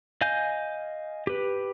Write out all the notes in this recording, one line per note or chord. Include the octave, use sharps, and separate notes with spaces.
D#5 F5 G#5 G6
G4 B4